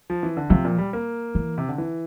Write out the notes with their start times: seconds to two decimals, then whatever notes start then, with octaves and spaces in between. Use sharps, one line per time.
0.10 F3
0.23 E3
0.37 D3
0.50 C3 F3
0.65 A#2
0.78 G3
0.93 A#3
1.35 E3
1.58 C3
1.69 D3
1.78 E3